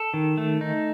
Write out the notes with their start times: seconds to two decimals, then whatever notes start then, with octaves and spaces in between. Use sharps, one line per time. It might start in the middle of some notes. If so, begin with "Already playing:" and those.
Already playing: A4
0.14 D#3
0.37 A3
0.61 D#4